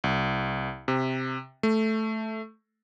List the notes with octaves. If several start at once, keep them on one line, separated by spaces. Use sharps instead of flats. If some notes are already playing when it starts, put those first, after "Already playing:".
C2
C3
A3